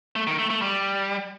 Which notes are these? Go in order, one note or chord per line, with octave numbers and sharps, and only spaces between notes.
A3
D#3
A3
A3
G3